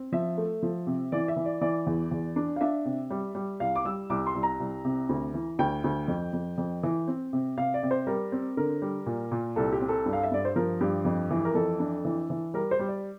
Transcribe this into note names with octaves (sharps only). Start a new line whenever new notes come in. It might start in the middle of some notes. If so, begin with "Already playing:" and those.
Already playing: C4
F3 E5
A3
F3
C3
E3 D5
E5
E3
D5
E3 D5
E2
E2
D4
F5
D4 E5
C3
G3
G3
C2 F5
D6
G3 E6
C2 D6
C6
C2
A#5
C2
C3
D2
E3
D2 G5
D2
F2
F2
F2
E3
C4
C3
C3 F5
D5
C3
C5
G3 A#4
C4
D3 A#4
G3
A#2
A#2
C2 A4
G4
C4
A4
G2
F5
E5
G2 D5
C5
F3 A#4
G2 G4
F2
E3
A#4
F2 A4
D4
E3
E3
G3 A#4
C5
G3
D5